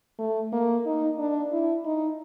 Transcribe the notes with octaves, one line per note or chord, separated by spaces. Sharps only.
A3
A#3
D#4
D4
E4
D#4